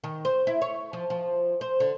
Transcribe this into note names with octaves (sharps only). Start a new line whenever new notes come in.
D#3
C5
E4
C#5
F3
F3
C5
D3